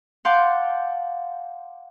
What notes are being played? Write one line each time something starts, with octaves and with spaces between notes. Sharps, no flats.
F5 F#5 A5 C6 D6 G6